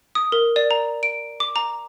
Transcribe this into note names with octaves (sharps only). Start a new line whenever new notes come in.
D#6
A#4
D5
A#5
D7
D6
A#5